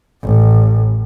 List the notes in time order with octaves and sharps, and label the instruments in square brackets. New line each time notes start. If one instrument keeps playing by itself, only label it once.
[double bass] A1